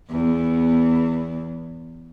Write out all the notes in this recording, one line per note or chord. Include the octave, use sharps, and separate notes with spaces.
E2 B3